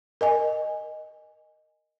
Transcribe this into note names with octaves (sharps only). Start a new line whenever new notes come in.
A#4 D#5 G#5